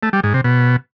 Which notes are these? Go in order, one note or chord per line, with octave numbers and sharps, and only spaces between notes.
A3
G3
G#2
C3
B2